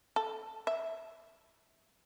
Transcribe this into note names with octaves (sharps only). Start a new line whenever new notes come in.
A4
E5